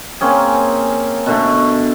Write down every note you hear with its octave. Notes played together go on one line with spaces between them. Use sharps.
A#3 C4 C#4 G#4
B2 D3 A3